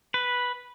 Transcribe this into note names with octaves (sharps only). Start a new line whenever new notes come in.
B4